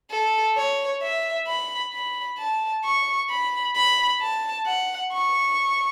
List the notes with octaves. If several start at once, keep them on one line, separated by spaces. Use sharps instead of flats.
A4
C#5
E5
B5
B5
A5
C#6
B5
B5
A5
F#5
C#6